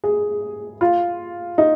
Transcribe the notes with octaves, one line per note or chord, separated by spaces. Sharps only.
G#4
F4
D#4